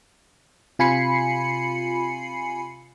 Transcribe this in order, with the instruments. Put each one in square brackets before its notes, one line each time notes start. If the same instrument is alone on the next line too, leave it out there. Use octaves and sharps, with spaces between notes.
[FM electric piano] C3 F4 G#5 B5 C7 C#7